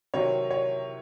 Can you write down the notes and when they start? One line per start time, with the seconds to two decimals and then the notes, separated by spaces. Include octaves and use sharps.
0.14 C3 D#3 F#3 C#5
0.51 C#5